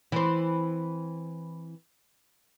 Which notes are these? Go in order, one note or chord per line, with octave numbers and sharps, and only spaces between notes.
E3 C4